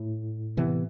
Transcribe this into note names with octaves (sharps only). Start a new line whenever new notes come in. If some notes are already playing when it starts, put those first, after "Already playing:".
Already playing: A2
C3 E3 B3